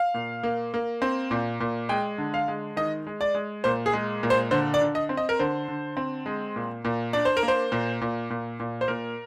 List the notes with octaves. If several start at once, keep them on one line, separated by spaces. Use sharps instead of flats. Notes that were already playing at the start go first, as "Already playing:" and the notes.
Already playing: F5
A#2
A#3
A#3
C4
A#2
A#2
G#3 G5
D3
F5
G#3
D#3 D#5
G#3
D5
G#3
A#2 C5
G#4
G#3
A#2
C5
D3 C5
D5
D3
D#5
C4
D#5
A#4
D3 C5
D3
C4
G#3
A#2
A#2
D4 D5
C5
A#4
A#3
C5
A#2
A#2
A#2
A#2
C5
A#2 A#4